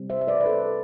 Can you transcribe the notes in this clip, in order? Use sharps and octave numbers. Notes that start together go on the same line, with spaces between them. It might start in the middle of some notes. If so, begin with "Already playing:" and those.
Already playing: C3 G3 C4
C5 E5
E5
B4 D5
B4
A4 C5